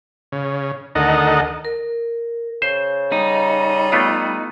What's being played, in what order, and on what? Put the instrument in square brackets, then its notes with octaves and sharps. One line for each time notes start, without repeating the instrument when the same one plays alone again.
[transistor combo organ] C#3
D2 D#3 A4 A#4 D#5 F#5
[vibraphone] A#4
[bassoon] C#3 [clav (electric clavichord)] C5
[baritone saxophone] G3 [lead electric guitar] D#4
[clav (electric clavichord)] A3 B3 F4